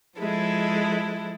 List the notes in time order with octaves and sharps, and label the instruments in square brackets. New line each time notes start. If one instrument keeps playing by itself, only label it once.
[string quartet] F3 G#3 E4 A4